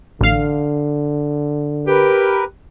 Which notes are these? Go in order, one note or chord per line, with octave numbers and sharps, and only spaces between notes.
A1 D3 F5
G4 A#4 B4